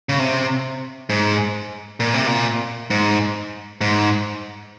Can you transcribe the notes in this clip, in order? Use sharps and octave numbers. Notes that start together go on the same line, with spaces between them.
C#3
C3
G#2
A#2
C3
A#2
G#2
G#2